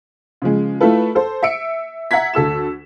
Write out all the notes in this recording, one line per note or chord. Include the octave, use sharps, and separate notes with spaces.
C#3 F3 G#3
A3 E4 F4 A4 B4
A4 C5
E5 E6 C#7 D7
E5 F#5 A#5 G#6 B6
D2 A4 E6 E7